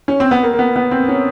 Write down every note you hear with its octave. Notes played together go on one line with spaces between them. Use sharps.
C#4
C4
B3
A#3
A#3
B3
B3
C4
C#4